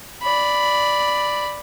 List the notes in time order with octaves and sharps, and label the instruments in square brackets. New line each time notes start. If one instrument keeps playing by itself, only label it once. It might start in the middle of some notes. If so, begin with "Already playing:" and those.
[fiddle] D5 B5